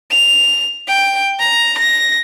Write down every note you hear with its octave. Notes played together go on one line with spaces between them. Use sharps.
F7
G5
A#5
A#6